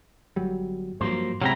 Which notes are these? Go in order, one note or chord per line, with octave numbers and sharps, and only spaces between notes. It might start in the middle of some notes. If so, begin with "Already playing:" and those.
G1 F#3 G3
G2 F3 F#3 A#3 C5
D2 C3 F#3 G#3 C4 C#4 E4 A#5